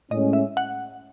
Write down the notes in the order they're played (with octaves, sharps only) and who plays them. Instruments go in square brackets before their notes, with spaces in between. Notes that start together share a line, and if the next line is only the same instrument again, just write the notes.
[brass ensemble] A2 G#3 C#4 [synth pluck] D#5
[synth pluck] E5
F#5